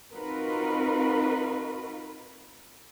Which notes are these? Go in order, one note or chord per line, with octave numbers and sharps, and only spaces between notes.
C4 D#4 F4 F#4 A#4 B4